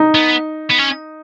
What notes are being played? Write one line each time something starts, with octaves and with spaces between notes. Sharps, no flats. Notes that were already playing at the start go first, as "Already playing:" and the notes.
Already playing: D#4
B3
B3
C#4